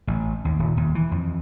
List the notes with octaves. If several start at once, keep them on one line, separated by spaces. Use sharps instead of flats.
A1
D#2
D#1
D#2
E3
F2